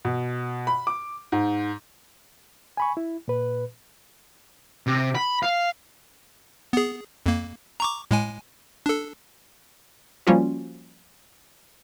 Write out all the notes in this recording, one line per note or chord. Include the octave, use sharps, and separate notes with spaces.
B2
B5
D6
G#2
G#5 B5 C#6
E4
A#2 B4
C3
B5
F5
B3 G#4
F2 A#3
A#5 C#6 D6
A2 G#3 G#5
D4 A4
F3 G3 A#3 C#4 F4 F#4